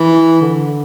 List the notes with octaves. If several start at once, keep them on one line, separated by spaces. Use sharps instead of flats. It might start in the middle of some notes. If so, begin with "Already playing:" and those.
Already playing: E3
D3